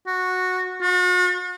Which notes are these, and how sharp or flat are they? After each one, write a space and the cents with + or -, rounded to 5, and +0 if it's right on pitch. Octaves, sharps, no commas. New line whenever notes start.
F#4 -10
F#4 -40